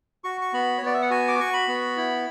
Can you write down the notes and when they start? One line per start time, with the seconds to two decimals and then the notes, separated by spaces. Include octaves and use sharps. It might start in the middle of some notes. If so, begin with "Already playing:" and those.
0.24 F#4 C#6
0.41 C#6
0.53 B3 B5
0.78 C#5
0.82 B3 D5
0.94 E5
1.02 F#5
1.10 F#4 G#5
1.28 D6
1.39 F#4 C#6
1.53 B5
1.68 B3
1.97 E4